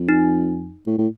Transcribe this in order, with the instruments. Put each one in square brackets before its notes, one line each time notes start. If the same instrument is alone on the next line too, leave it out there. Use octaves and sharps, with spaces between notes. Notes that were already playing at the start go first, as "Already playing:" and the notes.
Already playing: [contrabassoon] F2
[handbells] D#4
[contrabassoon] A2
A2